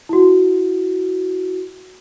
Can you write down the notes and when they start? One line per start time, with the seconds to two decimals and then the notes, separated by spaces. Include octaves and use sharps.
0.09 E4 F#4